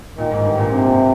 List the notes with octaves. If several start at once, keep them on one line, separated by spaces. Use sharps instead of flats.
A#2 D#3
G#2
G2
A#2
C3
A#2